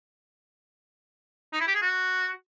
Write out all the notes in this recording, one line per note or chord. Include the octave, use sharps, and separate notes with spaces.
D#4
E4
G4
G#4
F#4